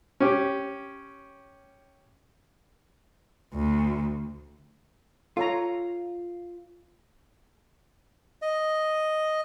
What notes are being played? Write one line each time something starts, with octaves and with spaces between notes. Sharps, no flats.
C#4 G4
D2
F4 A4 C#5 A#5
D#5